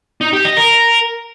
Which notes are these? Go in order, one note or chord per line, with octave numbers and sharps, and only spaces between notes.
D#4
G4
D#5
A#4